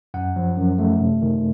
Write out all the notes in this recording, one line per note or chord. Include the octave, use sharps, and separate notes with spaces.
F#2 F#5
F3
F#2
A3
C3
D#3